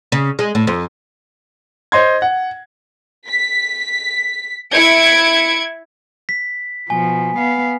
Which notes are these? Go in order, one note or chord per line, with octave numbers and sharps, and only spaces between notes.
C#3
G#3
A2
F2
C5 D#5 C6 G#6
F#5
B6
E4 G#6 C#7 D7
B6
B2 F3 G#5
B3 F5